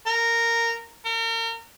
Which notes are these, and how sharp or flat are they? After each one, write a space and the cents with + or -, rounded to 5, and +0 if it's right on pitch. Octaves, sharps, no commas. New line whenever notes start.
A#4 -10
A#4 -35